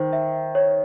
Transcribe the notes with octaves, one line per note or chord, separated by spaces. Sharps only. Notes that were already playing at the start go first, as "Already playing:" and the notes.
Already playing: D#3 C5
E5
E5
C#5